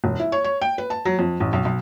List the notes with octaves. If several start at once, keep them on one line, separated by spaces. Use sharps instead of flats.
E1
E4
C#5
C#5
G5
B4
A5
F#3
F2
A1
B1
B1